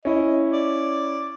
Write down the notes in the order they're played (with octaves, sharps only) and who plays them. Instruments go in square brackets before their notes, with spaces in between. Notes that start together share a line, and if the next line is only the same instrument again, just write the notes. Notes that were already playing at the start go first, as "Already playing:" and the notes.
[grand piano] C#4 E4 [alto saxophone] D#5
[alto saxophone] D5